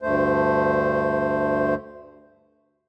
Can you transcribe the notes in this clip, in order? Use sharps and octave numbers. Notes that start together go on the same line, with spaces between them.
D2 G2 A3 C5